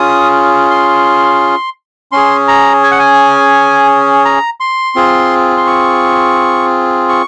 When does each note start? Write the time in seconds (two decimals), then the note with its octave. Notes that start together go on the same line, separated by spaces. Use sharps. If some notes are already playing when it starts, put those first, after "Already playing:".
Already playing: C#4 F4 G#4 D#6
0.70 C6
2.12 C#4 G#4 C6
2.48 A#5
2.83 G#5
2.91 F#5
2.99 G#5
4.25 A#5
4.60 C6
4.96 C4 F4 G#4
5.57 C6
5.67 C#6
7.09 C#6